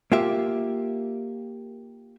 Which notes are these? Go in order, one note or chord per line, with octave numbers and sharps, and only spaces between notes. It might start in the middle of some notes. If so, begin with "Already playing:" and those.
A#3 F4 G4 E5